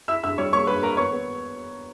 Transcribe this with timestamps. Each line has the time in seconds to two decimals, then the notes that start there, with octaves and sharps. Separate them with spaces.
0.08 E4 E5 E6
0.23 G2 E5 E6
0.38 G3 C#5 C#6
0.53 A#3 C#5 C#6
0.67 G2 B4 B5
0.83 A#3 A#4 A#5
0.97 B3 C#5 C#6
1.12 B3